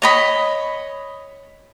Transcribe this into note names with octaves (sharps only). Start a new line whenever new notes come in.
C#5 D#5 B5